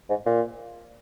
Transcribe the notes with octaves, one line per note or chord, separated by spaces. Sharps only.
G#2
A#2